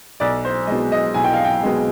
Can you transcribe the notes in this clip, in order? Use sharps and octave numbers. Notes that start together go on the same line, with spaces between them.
B1 D5
C5
B2 G#3 D#5
D#5
B1 G#5
G5
F5
G5
B2 G#3